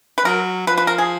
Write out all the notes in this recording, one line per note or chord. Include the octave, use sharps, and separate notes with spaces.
B4
F#3 A#4
F3 B4
B4
A#4
G#4